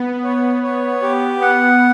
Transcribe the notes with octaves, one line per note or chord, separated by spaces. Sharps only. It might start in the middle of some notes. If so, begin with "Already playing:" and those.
Already playing: B3
C#5
C#5
G4
B3 F#5